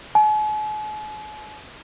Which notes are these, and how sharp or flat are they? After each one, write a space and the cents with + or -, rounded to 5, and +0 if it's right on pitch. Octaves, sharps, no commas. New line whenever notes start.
G#5 +45